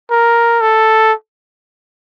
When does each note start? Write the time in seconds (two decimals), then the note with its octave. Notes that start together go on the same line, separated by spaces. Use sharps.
0.11 A#4
0.61 A4